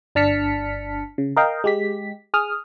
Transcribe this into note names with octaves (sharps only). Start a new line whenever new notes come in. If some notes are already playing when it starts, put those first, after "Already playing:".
G1 D4 A5 F6 B6 C#7
C#3
A#4 D#5 F5 G5
G#3 G4 B6
G#4 D#6 F6